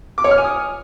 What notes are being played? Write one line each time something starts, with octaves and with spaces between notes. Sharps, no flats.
D6
C#5
F6
G#5
D#6